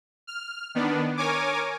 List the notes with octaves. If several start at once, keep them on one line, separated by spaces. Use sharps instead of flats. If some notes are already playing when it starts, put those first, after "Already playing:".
F6
D#3 B3 D4
A#4 C#5 G#5 D6